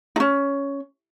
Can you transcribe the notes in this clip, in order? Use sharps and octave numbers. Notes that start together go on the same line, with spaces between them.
C#4 D#4